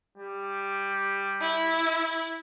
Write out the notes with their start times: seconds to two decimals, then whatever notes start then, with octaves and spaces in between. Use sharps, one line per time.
0.17 G3
1.41 E4